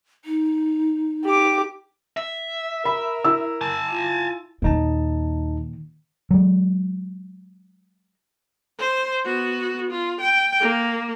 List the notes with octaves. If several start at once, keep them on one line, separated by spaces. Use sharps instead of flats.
D#4
G4 D6
E5
A#4 B5
E4 E6
G#5 A5
F4
D#2 A#2 D#3 D#4 A5
F#3 G#3
C5
B3 F#4
F4
G5
A#3